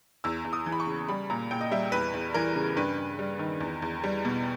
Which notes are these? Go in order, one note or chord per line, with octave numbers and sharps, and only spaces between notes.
E2 E6
E2
D#6
E3
B5
C#6
C#3
G3 B5
A#2 A#5
A#2 G5
D#5
G3 E5
E2 B4
E2
E3 A#4
C#3
G2 B4
G2
G3
D#3
E2
E2
G3
B2